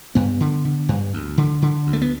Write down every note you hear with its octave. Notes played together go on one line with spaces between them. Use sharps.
G2 B3
D3
D3
G2
D2
D3
D3
D2
A3
B3